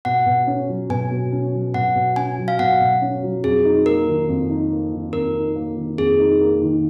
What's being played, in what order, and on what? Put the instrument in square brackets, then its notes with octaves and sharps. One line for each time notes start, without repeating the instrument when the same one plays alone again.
[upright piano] B2 [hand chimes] F#5
[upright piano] B2
C#4
F#3
[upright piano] B2 [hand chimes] G#5
[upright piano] B2
C#4
F#3
[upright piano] B2 [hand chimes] F#5
[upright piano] B2
[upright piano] C#4 [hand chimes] G#5
[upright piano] F#3
[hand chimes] F5
[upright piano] B2 [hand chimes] F#5
[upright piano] B2
C#4
F#3
[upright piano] F2 [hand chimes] G#4
[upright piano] D#4
[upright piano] A#3 [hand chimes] A#4
[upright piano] D#3
F2
D#4
A#3
D#3
[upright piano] F2 [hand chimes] A#4
[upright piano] D#4
A#3
D#3
[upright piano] F2 [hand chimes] G#4
[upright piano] D#4
A#3
D#3